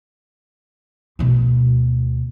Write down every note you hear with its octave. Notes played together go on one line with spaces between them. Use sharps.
D2 B2